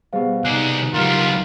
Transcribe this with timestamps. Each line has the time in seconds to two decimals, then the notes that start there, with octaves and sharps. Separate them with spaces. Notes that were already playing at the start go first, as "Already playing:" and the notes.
0.13 B2 G3 G#4 C5 F5
0.44 C3 D#4 G#4 D5 F#6 C7 D7
0.94 C#2 F#3 G3 F4 A#4